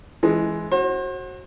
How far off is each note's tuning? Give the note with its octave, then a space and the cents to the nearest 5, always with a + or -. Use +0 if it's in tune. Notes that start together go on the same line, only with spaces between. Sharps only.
E3 +0 G#3 +10
F#4 +0 C5 +40